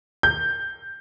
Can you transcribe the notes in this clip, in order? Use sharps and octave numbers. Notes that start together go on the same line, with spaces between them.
G6